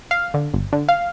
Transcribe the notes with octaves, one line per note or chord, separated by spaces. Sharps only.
F5
D3
G1
D3
F5